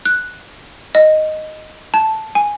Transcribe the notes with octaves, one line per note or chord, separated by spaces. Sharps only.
F#6
D#5
A5
G#5